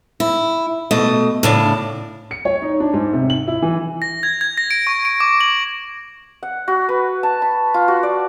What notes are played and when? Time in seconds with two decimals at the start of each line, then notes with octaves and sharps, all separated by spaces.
0.20 E4
0.91 B2 A3 D#5
1.43 A2 C#3 D4
2.31 C#7
2.45 C#5
2.62 D#4
2.80 D4
2.94 G#2
3.13 C3
3.30 F#7
3.47 E4
3.62 E3
4.02 A#6
4.23 G#6
4.41 G#6
4.58 A#6
4.71 D7
4.87 C#6
5.05 D7
5.20 D6
5.41 F#7
6.43 F#5
6.68 F#4
6.89 B4
7.23 A5
7.42 B5
7.74 F4
7.88 F#4
8.03 D5